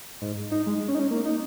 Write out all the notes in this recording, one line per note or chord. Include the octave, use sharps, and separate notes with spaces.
G#2
D#4
G#3
C#4
D#4
C#4
A#3
D#4